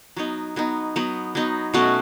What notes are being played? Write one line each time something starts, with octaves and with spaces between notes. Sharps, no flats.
F#3 B3 D#4
F#3 B3 D#4
F#3 B3 D#4
F#3 B3 D#4
B2 A3 C#4 F#4